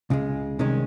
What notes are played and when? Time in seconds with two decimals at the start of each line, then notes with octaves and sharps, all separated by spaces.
0.10 C#2 C#3 G#3
0.59 C2 C3 D#3 G#3 C#4